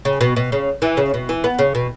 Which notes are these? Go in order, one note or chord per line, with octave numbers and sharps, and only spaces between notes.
C#3
B2
B2
C#3
E3
C#3
B2
E3
B3
C#3
B2